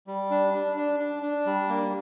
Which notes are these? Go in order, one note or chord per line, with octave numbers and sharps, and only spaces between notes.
G3
D4
D4
D4
D4
D4
G3
A#3